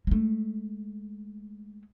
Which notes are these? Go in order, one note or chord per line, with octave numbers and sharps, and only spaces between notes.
G#3 A3